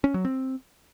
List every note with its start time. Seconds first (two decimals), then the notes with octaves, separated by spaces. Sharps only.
0.04 C#4
0.14 F#3
0.25 C4